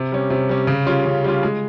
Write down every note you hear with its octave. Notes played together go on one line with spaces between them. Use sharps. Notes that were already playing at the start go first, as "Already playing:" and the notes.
Already playing: C3
G3 C#4
C3
G3 C#4
C#3
G3 C#4 F4
C#3
G3 C#4 F4
G#3